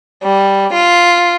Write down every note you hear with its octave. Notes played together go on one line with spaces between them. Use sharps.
G3
F4